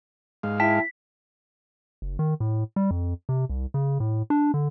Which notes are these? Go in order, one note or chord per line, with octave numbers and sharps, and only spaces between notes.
G#2 G#3 F5
E4 G5 A5 B6
F#1
D#3
A2
G3
F2
C3
C2
C#3
A2
D4
D3